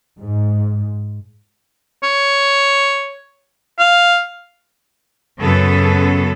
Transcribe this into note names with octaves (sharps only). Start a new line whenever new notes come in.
G#2
C#5
F5
F#2 C#3 B3 A4